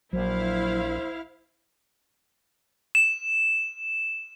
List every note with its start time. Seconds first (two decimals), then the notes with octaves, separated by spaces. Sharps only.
0.13 A#1 F#3 E4 C5 F5
2.95 E7